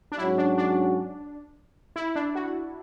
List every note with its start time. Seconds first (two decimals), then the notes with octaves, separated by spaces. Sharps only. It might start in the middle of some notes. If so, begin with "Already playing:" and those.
0.12 D4
0.18 G#2 F#3 C#4 E4 F#4
0.38 D4
0.58 D4
1.96 E4
2.16 D4
2.35 F#4